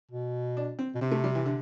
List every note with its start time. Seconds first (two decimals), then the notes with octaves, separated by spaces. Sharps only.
0.11 B2
0.57 D4
0.79 C4
0.95 B2
1.01 C3 C4
1.12 A3
1.24 G3
1.35 E3
1.46 D3